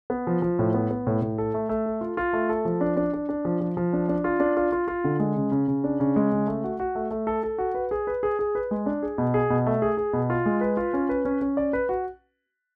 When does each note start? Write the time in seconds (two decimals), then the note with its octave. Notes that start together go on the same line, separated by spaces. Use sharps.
0.10 B3
0.27 F3
0.42 F3
0.59 A2
0.74 B3
0.90 B3
1.07 A2
1.22 A2
1.38 A4
1.54 A3
1.69 A3
1.86 A4
2.01 F4
2.17 F4
2.33 A3
2.49 A4
2.65 F3
2.81 D4
2.97 D4
3.13 D4
3.29 D4
3.45 F3
3.61 F3
3.77 F3
3.93 D4
4.09 D4
4.24 F4
4.40 D4
4.57 F4
4.72 F4
4.88 F4
5.04 D3
5.20 G#3
5.36 C#3
5.51 C#3
5.68 C#3
5.84 D4
6.00 C#3
6.16 G#3
6.32 C#3
6.47 A3
6.64 F#4
6.80 F#4
6.95 A3
7.11 A3
7.27 A4
7.43 A4
7.58 F#4
7.75 B4
7.91 G#4
8.07 B4
8.23 G#4
8.39 G#4
8.55 B4
8.71 G#3
8.86 D4
9.02 G#4
9.18 B2
9.34 G#4
9.50 B2
9.66 A3
9.82 G#4
9.97 G#4
10.13 B2
10.30 F4
10.46 G#3
10.61 B4
10.77 F4
10.93 C#4
11.09 B4
11.25 C#4
11.41 C#4
11.57 D5
11.73 B4
11.89 F#4